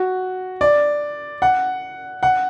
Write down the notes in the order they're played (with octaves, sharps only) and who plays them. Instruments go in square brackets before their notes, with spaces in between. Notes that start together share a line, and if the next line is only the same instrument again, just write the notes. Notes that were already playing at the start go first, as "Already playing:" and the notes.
Already playing: [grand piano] F#4
D5
F#5
F#5